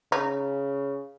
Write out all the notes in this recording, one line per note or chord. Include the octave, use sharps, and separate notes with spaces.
C#3 D#4